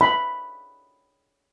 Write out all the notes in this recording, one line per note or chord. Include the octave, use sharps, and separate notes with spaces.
B5